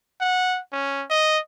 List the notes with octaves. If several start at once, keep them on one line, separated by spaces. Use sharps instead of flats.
F#5
C#4
D#5